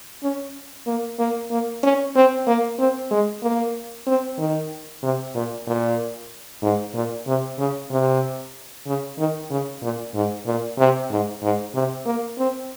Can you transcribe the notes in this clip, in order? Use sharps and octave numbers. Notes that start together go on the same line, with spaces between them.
C#4
A#3
A#3
A#3
C#4
C4
A#3
C4
G#3
A#3
C4
D#3
C3
A#2
A#2
G#2
A#2
C3
C#3
C3
C#3
D#3
C#3
A#2
G#2
A#2
C3
G#2
G#2
C3
A#3
C4